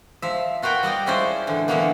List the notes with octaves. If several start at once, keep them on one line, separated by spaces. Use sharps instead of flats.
F3 E5
F4 F#4 A#4 B4 G5
G3 D5 D#5 G5
F3 G#3 C#4 E4 C5 D5
A2 D3 E3
B2 D3 E3 F#3 A#3 B3